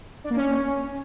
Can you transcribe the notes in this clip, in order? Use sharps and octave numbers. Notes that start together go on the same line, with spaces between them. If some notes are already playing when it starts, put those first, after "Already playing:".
D4
A#3
C#4